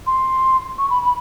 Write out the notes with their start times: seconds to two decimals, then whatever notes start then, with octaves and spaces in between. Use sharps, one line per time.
0.07 C6
0.78 C#6
0.90 B5
1.02 B5